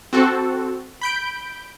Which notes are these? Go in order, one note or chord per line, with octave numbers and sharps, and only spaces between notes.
C4 F#4 A4
B5 G6 D7